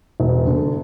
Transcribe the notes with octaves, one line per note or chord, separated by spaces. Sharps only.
E1
D3